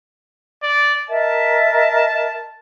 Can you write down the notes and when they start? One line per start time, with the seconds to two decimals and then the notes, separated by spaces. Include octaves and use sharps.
0.63 D5
1.10 A#4 D#5 E5 A5